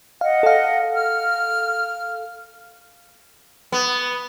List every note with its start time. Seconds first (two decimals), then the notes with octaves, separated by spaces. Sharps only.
0.21 D#5 F5 F#5
0.43 A4 F5
0.93 F6
3.72 B3